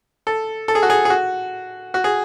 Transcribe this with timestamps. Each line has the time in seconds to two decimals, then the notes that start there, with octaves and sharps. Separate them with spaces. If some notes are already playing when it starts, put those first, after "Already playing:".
0.27 A4
0.68 A4
0.75 G#4
0.83 F#4
0.90 G#4
1.05 G#4
1.10 F#4
1.94 F#4
2.04 G#4